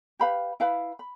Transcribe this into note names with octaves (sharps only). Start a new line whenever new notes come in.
G4 B4 F5 B5
E4 B4 F5 B5
B5